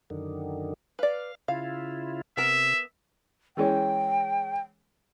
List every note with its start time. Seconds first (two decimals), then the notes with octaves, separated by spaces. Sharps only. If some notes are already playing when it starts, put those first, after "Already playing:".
0.10 F#2 D3 D#3
0.99 B4 D5 F5
1.48 C#3 E4 F4 F5
2.37 C3 B3 A#4 E5
3.57 E3 G#3 C#4 G5